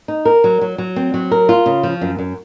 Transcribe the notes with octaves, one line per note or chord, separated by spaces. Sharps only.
D#4
A#4
F#3
F#3
F#3
C4
F#3
A#4
F4
C#3
F3
F#2
F#2